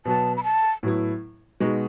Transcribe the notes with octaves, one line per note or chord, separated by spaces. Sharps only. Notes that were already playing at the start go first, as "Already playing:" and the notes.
B2 F#3 B3 A5
B5
A5
A2 F#3 B3 E4
B2 G#3 D#4 F#4